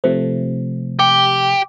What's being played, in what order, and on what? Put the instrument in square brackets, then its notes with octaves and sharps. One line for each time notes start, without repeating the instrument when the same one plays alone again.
[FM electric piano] C3 F3 A3 [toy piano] C5
[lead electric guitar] G4 [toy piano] G5